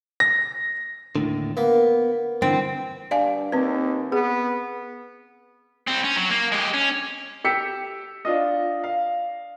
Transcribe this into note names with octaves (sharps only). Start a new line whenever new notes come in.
A#6
D#2 A2 D3
A#3 B3
G2 D3 E3 C4
G2 D5 F5 G#5
D#2 C4 B4
B3 G#4
G3 C4
C#4
F#3
A#3
G#3 G4
C#4
G4 E6 B6 C#7
D4 F4 D#5
F5